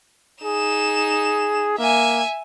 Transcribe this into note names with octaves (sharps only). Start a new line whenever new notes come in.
D#4 G#4 E7
A#3 E5 G#5